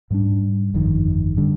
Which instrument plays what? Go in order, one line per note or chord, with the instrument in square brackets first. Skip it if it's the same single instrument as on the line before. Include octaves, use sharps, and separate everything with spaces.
[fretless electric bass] G#2 G3 D4
G1 F2 D#3
D3 G3 D4